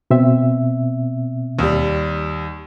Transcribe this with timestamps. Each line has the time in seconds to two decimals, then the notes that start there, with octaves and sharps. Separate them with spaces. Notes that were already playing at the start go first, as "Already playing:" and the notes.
0.11 B2 C4 E5
1.59 D#2 G3